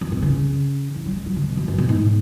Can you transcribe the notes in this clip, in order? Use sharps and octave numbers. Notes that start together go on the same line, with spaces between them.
F#2
B2
C#3
E3
F#3
G#3
F#3
C#3
B2
F#2
F#2
B2
G#2